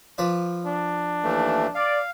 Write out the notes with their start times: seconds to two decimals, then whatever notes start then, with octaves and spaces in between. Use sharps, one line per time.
0.18 F3 B4 D5
0.66 D4
1.24 D#2 E3 A3
1.75 D5 F5